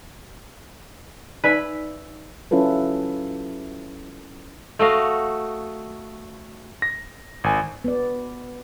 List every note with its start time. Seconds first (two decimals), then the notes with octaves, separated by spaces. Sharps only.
1.44 D#4 B4 D5 E5 G#5
2.51 F#3 C#4 E4 F4 A4 B4
4.79 A3 F#4 D#5 F5
6.82 A#6
7.44 G#1 G#5
7.84 B3 D5